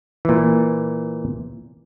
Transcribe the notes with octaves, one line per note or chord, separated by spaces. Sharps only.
A#2 E3